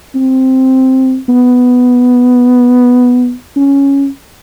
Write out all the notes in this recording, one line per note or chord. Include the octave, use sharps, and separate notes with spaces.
C4
B3
C#4